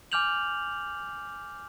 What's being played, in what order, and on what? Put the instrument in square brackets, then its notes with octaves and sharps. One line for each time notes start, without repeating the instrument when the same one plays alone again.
[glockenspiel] G#5 D6 F6 G6 F7 F#7